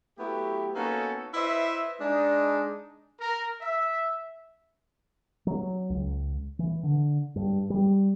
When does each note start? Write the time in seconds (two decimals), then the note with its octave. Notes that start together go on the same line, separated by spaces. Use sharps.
0.18 F#3 A3 B3 E4 G4
0.74 A#3 B3 C#4 D#4 F#4 A4
1.34 E4 B4 C5 D#5 E5
2.00 G#3 D4 D#4
3.20 A#4
3.61 E5
5.47 F#3
5.90 C#2
6.59 E3
6.83 D3
7.36 G2
7.70 G3